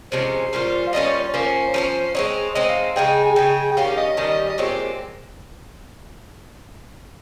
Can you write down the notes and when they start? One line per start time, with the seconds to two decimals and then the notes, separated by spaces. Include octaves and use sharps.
0.12 C3 F3 G#3 C#4 C5
0.53 A#2 G3 C#4 F4
0.87 F5
0.93 A#2 G3 C#4 F4 D#5
1.07 C#5
1.21 C#5
1.34 F3 A#3 C#4 C5
1.74 F3 A#3 C#4
2.15 G#3 C4 D#4 C#5
2.55 G#3 C4 D#4 D#5
2.69 F5
2.83 F5
2.96 C#3 G#3 D#4 G#4 G5
3.25 G#5
3.36 C#3 G#3 D#4 G#4 G5
3.71 G5
3.77 D#3 G3 C#4 G4 F5
3.92 F5
3.97 D#5
4.17 D#3 G3 C#4 G4 D#5
4.49 D#5
4.58 A#2 G#3 C4 G4 C#5